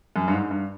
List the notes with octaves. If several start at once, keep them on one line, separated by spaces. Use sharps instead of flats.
F#2
G2
G#2
G2